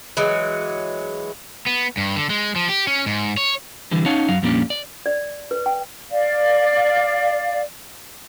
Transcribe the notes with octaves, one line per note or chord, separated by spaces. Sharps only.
E3 F#3 G#3
B3
G2
D3
G#3
F3
G4
C#4
G#2
C#5
D3 E3 G3
C#4 D#4 C#5 F5 F#5 A5
F#2 F#3 F5
F2 A#2 G3 A#3 C#4 D4
D5
D5
B4
G5
D5 F5